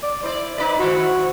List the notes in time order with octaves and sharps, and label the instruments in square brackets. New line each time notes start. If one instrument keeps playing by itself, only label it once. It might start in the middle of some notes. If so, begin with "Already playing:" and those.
[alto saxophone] D5
[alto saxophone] E4 [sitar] C5 D5
[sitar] D#4 B4 D5
[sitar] D#3 E4 C5 [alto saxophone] F#4